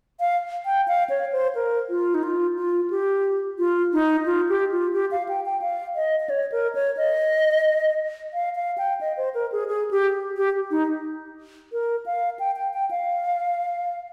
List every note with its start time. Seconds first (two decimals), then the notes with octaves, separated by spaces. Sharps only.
0.20 F5
0.66 G5
0.88 F5
1.10 C#5
1.32 C5
1.55 A#4
1.90 F4
2.14 D#4
2.23 F4
2.57 F4
2.90 G4
3.59 F4
3.93 D#4
4.26 F4
4.49 G4
4.72 F4
4.94 G4
5.11 F5
5.29 G5
5.46 G5
5.62 F5
5.96 D#5
6.20 D#5
6.30 C#5
6.52 A#4
6.75 C#5
6.97 D#5
8.33 F5
8.55 F5
8.78 G5
9.01 D#5
9.17 C5
9.35 A#4
9.52 G#4
9.68 G#4
9.91 G4
10.37 G4
10.71 D#4
11.73 A#4
12.06 F5
12.40 G5
12.56 G5
12.74 G5
12.91 F5